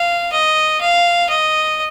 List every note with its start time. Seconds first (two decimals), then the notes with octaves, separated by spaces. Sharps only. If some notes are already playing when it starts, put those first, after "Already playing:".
Already playing: F5
0.32 D#5
0.81 F5
1.29 D#5